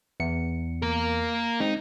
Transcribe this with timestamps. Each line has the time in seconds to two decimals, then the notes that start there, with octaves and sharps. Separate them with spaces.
0.20 E2 C#7
0.82 A#3 A#4
1.60 G#3 C4 D#4